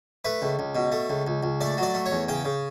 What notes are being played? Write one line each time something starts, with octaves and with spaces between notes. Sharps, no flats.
A3 B4
C#2
C#2
B2
A3
C#2
C#2
C#2
A3 D5
F#3
D5
A3
C#5
E2
C#3 G5
C#3